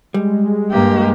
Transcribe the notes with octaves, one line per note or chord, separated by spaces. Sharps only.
G3 G#3
G2 A#3 G4